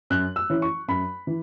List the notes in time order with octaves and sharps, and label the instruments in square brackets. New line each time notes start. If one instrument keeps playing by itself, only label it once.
[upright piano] F#2 F#6
E6
E3 C#4 E4
C#6
F#2 B5
E3